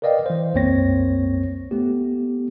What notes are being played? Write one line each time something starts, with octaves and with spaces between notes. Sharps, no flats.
A#4 B4 D5 D#5 F5 G5
E3 C5
C2 F#2 A#3 C4 C#5 A#6
A3 B3 G4